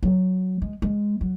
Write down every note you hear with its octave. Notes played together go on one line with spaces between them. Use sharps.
F#3
G#3
G#3
F#3